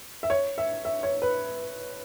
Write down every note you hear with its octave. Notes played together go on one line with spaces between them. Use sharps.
E5
C#5
E5
E5
C#5
B4